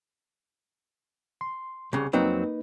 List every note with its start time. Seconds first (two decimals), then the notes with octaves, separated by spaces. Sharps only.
1.41 C6
1.93 C2 C#3
2.13 F2 F#3 A#3 C4 D#4 B4